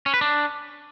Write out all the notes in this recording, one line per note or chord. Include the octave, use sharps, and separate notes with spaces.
C#4
B4
D4